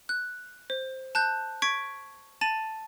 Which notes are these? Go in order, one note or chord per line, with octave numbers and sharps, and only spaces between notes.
F#6
C5
A5 F#6 G6
C#6 G#6 B6 D7
A5 A6 D#7 F#7